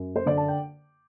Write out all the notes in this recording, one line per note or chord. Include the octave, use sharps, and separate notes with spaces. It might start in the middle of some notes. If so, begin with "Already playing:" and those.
Already playing: F#2
C5
D3 D5
A5
G5